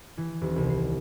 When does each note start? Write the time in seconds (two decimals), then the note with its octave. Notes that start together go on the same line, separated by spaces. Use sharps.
0.18 E3
0.41 D#1
0.56 C2
0.70 C7